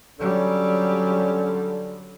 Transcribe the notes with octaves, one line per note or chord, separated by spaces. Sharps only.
D3 F#3 G3 C#4